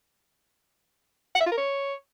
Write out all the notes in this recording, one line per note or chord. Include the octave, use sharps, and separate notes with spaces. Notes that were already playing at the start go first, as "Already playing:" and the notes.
F#5
E5
F4
A#4
C#5